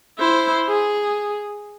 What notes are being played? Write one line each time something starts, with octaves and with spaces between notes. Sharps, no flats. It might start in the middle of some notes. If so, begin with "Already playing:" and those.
E4 C5
G#4